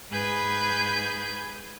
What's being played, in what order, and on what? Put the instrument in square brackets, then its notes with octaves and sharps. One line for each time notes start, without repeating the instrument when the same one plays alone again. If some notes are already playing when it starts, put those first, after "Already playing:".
[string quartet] G#2 G#4 B4 G#5 B5 G6